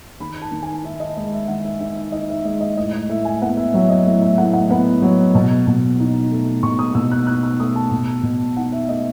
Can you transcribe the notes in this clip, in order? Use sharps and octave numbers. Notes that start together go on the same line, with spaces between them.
D#3 B5
A5
D#3
G#5
D#4 E5
D#5
G#3 D#5
E5
D#3 F#5
E5
D#3 E5
E5
D#4 D#5
E5
G#3 D#5
D#5
A2 D#5
D#5
A2 E5
G#5
B3 F#5
E5
F#3 E5
D#5
A2 E5
E5
A2 F#5
F#5
B3 F#5
F#3
B2
B2
D#4
A3
B2 C#6
D#6
B2 E6
F#6
D#4 F#6
E6
A3 D#6
A5
B2
B2
D#4 F#5
E5
A3 D#5